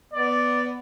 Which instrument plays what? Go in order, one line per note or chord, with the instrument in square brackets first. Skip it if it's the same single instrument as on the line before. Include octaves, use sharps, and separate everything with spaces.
[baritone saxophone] B3 [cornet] D5